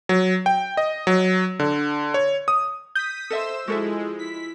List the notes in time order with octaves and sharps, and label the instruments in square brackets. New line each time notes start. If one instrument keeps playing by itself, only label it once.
[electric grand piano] F#3
G5
D#5
F#3
D3
C#5
D#6
[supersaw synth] D#6 B6 [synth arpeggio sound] G6
[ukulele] A4 D#5 E5 [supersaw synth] C5 E6 E7
[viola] F3 E4 [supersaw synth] G#3 [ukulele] F#4 A4 E5
[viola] E4 [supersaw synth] B6